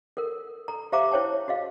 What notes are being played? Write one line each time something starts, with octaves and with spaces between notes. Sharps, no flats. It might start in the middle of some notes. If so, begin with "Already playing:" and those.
A4 A#4
A4 A#5
G4 C5 E5 F5 A#5 D6
E4 C5 C#5 G5 A5
F#4 G#4 D#5 F5